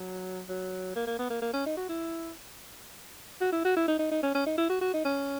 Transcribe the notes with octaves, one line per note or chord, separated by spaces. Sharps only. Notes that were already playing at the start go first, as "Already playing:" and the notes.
Already playing: F#3
F#3
A#3
A#3
B3
A#3
A#3
C#4
D#4
F#4
E4
F#4
E4
F#4
E4
D#4
D#4
D#4
C#4
C#4
D#4
E4
F#4
F#4
D#4
C#4